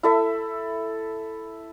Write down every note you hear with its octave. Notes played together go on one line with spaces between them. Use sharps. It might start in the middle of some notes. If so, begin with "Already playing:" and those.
E4 A4 E5